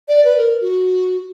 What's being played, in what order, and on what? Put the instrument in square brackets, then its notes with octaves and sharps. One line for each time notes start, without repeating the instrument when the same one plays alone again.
[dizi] D5
B4
A#4
F#4